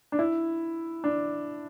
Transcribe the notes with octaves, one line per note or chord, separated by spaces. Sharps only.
D4
E4
D4